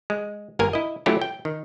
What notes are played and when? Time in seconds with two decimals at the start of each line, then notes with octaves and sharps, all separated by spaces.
0.10 G#3
0.59 G1 A#3 A#4 G#5
0.73 E4 D#5
1.06 F#3 A3 C#4 E4 F4 G4
1.21 G5
1.45 D#3